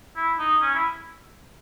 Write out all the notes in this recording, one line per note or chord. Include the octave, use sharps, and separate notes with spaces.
E4
D#4
C#4
E4